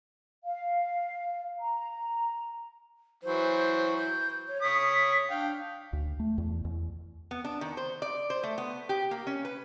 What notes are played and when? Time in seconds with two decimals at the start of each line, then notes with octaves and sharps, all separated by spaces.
0.44 F5
1.59 A#5
3.23 E3 F#3 C5
3.98 G6
4.48 C#5
4.62 C#5 D#6 B6
5.30 D4 F5 G5
5.93 D2
6.20 A3
6.38 E2
6.65 E2
7.31 B3
7.45 D4
7.61 D#3
7.77 C5
8.02 D5
8.30 C5
8.43 A3
8.58 B3
8.89 G4
9.11 A#3
9.27 C#4
9.45 B4